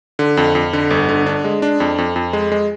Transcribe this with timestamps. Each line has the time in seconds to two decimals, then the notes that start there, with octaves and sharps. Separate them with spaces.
0.19 D3
0.37 F2
0.55 F2
0.73 D3
0.91 G1
1.09 D3
1.26 D4
1.44 G#3
1.62 D4
1.80 F2
1.98 F2
2.16 F2
2.33 G#3
2.52 G#3